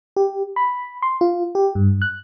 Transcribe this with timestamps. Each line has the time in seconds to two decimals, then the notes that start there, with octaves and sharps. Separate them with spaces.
0.16 G4
0.56 B5
1.02 C6
1.21 F4
1.55 G4
1.75 G2
2.02 F#6